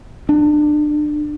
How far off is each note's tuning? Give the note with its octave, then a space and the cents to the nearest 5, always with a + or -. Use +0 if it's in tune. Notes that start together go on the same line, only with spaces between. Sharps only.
D4 +30